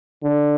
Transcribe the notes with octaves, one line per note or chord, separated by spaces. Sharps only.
D3